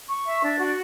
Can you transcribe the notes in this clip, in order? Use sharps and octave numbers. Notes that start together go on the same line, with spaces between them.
C#6
E5
D4
F#4